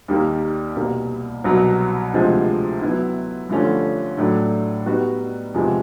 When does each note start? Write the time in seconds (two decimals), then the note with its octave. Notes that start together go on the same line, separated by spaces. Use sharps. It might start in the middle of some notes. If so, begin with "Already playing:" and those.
0.08 D#2 D#3 G3 A#3
0.76 C2 B2 G3 A#3
1.44 C2 B2 F#3
2.13 D2 C3 F3 G#3
2.81 F#3 B3 E4
3.49 G2 D3 F3 A3 C#4
4.17 A2 F#3 A3 D4
4.86 G3 B3 D#4 F#4
5.54 E2 C3 F3 G#3